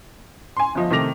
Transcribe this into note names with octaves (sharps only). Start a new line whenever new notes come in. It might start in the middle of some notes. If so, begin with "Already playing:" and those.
G#5 C6
G1 F3 D#5
C3 D#3 A3 D6 A#6 F7